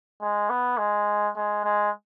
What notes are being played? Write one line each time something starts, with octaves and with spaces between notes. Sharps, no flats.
G#3
B3
G#3
G#3
G#3